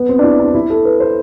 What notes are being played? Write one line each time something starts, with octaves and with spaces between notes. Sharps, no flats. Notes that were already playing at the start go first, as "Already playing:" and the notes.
Already playing: B3
C4
D4
E4
D4
E4
A4
B4
C5